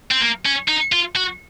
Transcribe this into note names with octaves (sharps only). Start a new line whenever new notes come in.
C4
A#3
C#4
D#4
F4
F#4